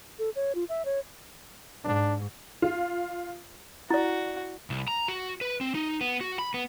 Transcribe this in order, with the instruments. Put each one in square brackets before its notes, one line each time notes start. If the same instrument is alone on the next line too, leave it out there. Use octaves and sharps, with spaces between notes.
[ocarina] A4
C#5
F4
E5
C#5
[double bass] G#2 [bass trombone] D4
[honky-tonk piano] F4
[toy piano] E4 D5 [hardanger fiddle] F#4
[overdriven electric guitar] C2
A#5
F#4
B4
C4
D#4
B3
F#4
B5
B3